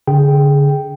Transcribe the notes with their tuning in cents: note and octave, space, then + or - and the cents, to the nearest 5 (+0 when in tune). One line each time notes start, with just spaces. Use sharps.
D3 -30 G#4 +0 G5 +0